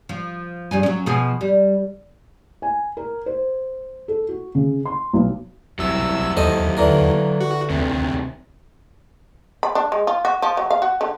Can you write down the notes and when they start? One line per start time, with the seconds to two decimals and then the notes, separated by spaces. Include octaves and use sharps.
0.09 F3
0.71 G2 G3 G#4
0.83 F#3 C#4
1.06 B2 F3 G#4
1.41 G3
2.62 G#5
2.97 A#4
3.26 C5
4.08 A4
4.29 F#4
4.55 C#3
4.85 C6
5.13 B1
5.79 C2 F#3 E4 E6
6.37 D#2 A4 C5 D#5
6.77 D3 E3 A#4
7.41 F#4
7.70 D2 C3 D#3
9.63 B5
9.75 D4
9.92 G#3
10.07 F4
10.25 F#4
10.42 F3
10.57 F#3
10.70 F5
10.82 F#4
11.01 D3